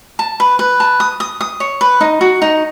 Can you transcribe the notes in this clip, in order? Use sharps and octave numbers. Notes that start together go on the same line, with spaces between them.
A5
B4
B4
A5
D#6
D#6
D#6
C#5
B4
D#4
F#4
D#4